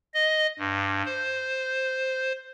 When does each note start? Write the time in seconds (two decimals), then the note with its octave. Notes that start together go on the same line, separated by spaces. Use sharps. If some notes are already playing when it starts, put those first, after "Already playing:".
0.14 D#5
0.59 G2
1.05 C5